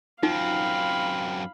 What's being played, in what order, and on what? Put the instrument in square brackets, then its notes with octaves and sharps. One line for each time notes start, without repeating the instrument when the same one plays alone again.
[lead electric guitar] F#2 C4 [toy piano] D#4 F4 [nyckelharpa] F5 B5